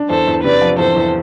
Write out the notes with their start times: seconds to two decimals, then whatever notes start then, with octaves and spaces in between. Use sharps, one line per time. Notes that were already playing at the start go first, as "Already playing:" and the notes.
Already playing: D4
0.10 E2 A4 C5
0.27 E2
0.44 C3 B4 D5
0.62 F3
0.78 E2 A4 C5
0.96 E2